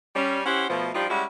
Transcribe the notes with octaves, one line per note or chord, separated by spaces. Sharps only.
G3 C#4
C#4 E4 G4 C5 F#5
B2 F3 A3
F3 G3 D4 D#4 F4 G4
G3 G#3 C#4 E4 F#4